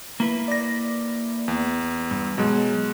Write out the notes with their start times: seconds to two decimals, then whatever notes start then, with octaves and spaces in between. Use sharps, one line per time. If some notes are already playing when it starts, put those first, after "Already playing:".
0.20 A#3 E4 B4
0.48 D5 A#6
1.48 E2
2.11 G2
2.38 B2 F#3 G#3